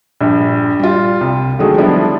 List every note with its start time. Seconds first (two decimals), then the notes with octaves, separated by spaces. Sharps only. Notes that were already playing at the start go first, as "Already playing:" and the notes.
0.20 A#1 G2
0.79 G3 F4
1.21 C2
1.59 D3 D#3 F#3 G#3 A3 G#4
1.78 D3 F3 G3 B3 D4 E4